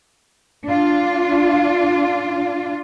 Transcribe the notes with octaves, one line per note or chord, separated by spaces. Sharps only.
D4 F4